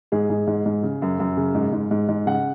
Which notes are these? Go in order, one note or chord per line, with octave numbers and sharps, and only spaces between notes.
G#2 G#4
G#2
G#2
G#2
C#3
F#2
F#2
C#3
G#2
G#2
G#2
G#2
C#3 F#5